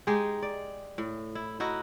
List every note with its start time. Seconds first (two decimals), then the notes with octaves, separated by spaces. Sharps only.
0.07 G#3 D#4 G4 G#4
0.42 D5
0.98 A2
1.35 E4
1.60 D#4 E4 F#4